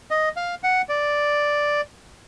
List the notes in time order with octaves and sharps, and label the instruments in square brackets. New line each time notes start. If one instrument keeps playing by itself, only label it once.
[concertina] D#5
F5
F#5
D5